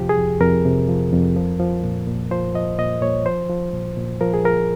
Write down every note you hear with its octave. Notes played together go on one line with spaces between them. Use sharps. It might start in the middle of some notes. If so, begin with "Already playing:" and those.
Already playing: F2 C3 F3 G4
G#4
F2
F2 A#4
C3
F3
F2
F3
F3
A#2
A#2
F3 C5
F3 D#5
A#2 D#5
A#2 C#5
F3 C5
F3
A#2
A#2
F3 A#4
G#4
F3 A#4